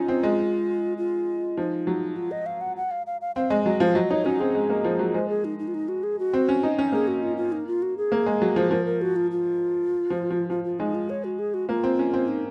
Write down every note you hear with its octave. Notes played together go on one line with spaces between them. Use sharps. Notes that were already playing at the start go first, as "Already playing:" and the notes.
Already playing: C#4 D#4 F4
C4
G#3
F4
F3 D#4
F#3
F4
D#5
F5
F#5
F#5
F5
F5
F5
C4 F5
G#3 D#5
F#3 D#5
F3 F5
F#3 D#5
D#4 C#5
C#4 F#4
C4 G#4
G#3
A#3
F3
F#3
G#3 C5
G#4
D#4
D#4
F4
D#4
F#4
G#4
F#4
C4
C#4
D#4
C#4
A#3 G#4
F#4
F4
F4
D#4
F4
F#4
G#4
A#3
G#3
F#3
F3
F3 A#4
A#4
F#4
F4
F4
F3
F3
F3 F4
F4
G#3 D#4
F4
C#5
F#4
G#4
F#4
A#3 F4
C4
C#4
C4
D#4